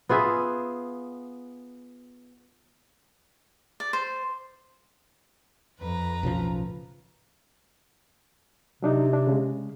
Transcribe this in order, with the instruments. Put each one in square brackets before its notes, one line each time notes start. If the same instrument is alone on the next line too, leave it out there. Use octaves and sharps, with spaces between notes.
[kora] B3 F4 G#4 E5
[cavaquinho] D5
C5
[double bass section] F2 [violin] B4 A#5
[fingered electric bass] B1 C#3 F3 [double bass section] A2
[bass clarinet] C3 [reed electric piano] F#3 D4 D#4
[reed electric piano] D4
C#3 G#3